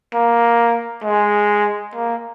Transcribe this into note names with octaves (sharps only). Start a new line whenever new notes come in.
A#3
G#3
A#3